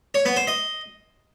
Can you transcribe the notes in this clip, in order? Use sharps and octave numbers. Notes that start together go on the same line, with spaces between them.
C#5
B3
C5
D#5